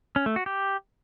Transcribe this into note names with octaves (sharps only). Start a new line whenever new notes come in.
C#4
A3
F#4
G4